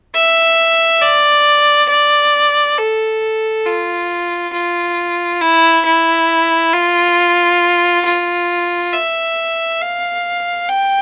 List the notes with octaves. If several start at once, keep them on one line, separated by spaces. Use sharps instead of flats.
E5
D5
D5
A4
F4
F4
E4
E4
F4
F4
E5
F5
G5